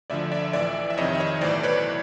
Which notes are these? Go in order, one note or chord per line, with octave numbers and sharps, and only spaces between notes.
D2 D3 F3 D5 E5
D5 E5
A1 A2 E3 D5 E5
E5
F2 C3 D#3 C#5 D#5
E5
C#5 D#5
B1 A2 E3 C5 D5
B4 C#5